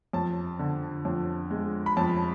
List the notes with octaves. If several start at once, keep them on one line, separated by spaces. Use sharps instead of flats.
F2 A5
D3
F2
G#3
B5
F2 A5